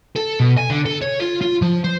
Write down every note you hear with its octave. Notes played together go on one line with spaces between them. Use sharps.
A4
B2
G#5
D3
A4
C#5
F4
F4
F3
C5